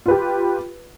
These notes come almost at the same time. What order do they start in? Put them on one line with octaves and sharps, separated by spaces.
F4 B4 G4